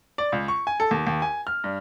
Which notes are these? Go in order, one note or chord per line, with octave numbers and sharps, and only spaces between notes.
D5
C#2
C#6
G#5
A4
D#2
D#2
G#5
F6
G2